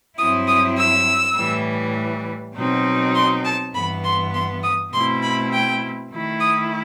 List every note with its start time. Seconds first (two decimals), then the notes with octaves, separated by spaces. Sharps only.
0.18 G2 F#3 C4 E4 D#6
0.47 D#6
0.77 E6
1.36 A2 E3 G3
2.55 B2 F#3 C4 D#4
3.15 C6
3.45 A5
3.74 G2 E3 B3 B5
4.04 C6
4.33 C6
4.63 D#6
4.93 B2 A3 C4 E4 C6
5.22 B5
5.53 G5
6.12 D#3 A3 E4
6.41 D#6